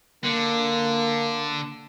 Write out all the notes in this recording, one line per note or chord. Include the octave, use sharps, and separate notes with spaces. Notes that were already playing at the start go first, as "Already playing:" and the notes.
D3 A#3